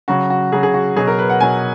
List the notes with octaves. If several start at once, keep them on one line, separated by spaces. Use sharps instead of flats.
C#3 F#3 F#4
F#4
C#3 F#3 G#4
G#4
F#4
B2 F#3 G#4
A#4
B4
F#5
B2 F#3 G#5